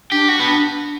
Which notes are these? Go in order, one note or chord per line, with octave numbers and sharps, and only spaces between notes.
D4 G4
F#4
B3